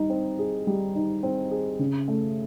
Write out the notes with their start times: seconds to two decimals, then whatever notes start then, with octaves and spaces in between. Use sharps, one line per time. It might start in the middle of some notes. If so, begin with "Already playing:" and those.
Already playing: G3 D#4
0.10 C4
0.39 G#4
0.67 G3
0.95 D#4
1.23 C4
1.51 G#4
1.79 C#3
2.08 A3